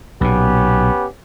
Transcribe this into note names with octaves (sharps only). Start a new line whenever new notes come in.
B1 A#2 B3 C#4 G4